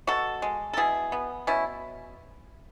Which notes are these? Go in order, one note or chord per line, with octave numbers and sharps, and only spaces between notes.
B2 F#4 A4
G#3
A4
B2 E4 G#4
B3
B2 C#4 E4